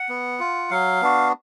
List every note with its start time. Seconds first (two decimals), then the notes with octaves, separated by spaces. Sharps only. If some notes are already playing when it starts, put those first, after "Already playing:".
Already playing: F#5
0.09 B3
0.40 F4
0.71 F#3 F5
1.02 B3 D4 F#4